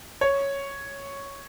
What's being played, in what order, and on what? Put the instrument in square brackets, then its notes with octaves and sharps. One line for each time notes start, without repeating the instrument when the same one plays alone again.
[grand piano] C#5